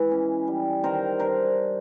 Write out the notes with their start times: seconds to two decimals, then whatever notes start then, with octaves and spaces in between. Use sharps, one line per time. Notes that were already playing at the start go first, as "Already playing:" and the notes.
Already playing: E3 G#3
0.11 C#4
0.47 G3
0.84 D#3 A#4 C5
1.19 D4 A#4 C5